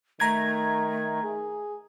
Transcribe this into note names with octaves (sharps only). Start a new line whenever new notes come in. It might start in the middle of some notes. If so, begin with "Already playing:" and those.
D#3 A3 A#5 G#6
G#4